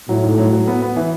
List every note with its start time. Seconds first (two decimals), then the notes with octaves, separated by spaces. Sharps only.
0.09 A2 F#3
0.23 G#2
0.38 F#3
0.53 F#3
0.67 B3
0.82 B3
0.96 E3